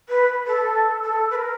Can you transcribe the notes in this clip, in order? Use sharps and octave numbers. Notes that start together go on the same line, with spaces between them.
B4
A4
A4
B4
A#4